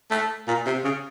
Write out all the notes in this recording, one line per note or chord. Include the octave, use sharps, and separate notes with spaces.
A3
A#2
C3
C#3